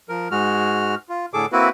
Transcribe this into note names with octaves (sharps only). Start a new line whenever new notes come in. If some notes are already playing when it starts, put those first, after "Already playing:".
F3 A#4
G#2 G#3 F#4 F6
F4
A2 D3 G#4 A4 D6
A#3 C4 E4 F#4 B4